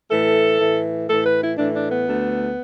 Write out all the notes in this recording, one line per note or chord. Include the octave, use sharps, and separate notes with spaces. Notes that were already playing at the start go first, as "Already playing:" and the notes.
A2 E3 A3 A4
A2 E3 A3
A2 E3 A3 A4
B4
E4
A2 E3 A3 D4
D4
B3
D2 D3 A3